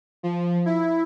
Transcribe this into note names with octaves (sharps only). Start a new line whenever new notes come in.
F3
E4